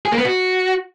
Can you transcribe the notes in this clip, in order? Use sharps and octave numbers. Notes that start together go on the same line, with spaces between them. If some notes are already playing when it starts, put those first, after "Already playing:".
G#4
A#3
B3
F#4